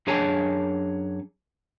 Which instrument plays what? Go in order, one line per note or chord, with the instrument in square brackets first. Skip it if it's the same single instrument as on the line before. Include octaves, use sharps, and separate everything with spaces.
[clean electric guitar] F#2 D4 G#4 C#5 G#5 A5